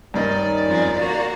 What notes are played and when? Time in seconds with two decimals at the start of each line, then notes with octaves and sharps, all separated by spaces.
0.14 G2 D#3 A#3 C#4 D#4 D5 D#5
0.66 F2 G#3
0.98 A#3 F#4